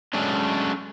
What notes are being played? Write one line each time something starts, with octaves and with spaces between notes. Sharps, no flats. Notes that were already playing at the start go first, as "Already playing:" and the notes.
F#3 G#3 A3 C#4 D4